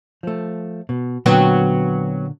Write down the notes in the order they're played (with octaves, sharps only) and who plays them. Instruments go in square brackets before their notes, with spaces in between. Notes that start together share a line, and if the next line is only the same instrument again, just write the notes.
[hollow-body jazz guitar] F3 A3
B2
[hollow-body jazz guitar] A#2 D3 [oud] F#3 B3 C4